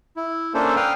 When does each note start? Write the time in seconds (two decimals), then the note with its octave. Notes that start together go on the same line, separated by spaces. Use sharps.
0.17 E4
0.54 A#3 C#4 D4 A4 C5
0.76 B4 F5 G5 D#6 F6